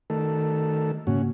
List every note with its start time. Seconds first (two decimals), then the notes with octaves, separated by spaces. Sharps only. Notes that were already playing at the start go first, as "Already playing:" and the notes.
0.10 D#3 A3 A4
1.07 G#2 C#3 A#3 C#4 F#4